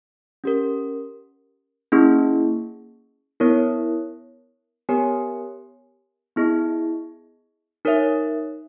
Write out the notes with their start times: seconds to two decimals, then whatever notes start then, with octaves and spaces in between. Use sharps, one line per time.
0.44 C#4 G4 A#4
1.92 A#3 C#4 E4 G#4
3.40 B3 E4 A#4 C#5
4.89 B3 G4 A#4 C#5 G#5
6.36 B3 E4 G#4 D#5
7.85 D#4 A#4 C#5 E5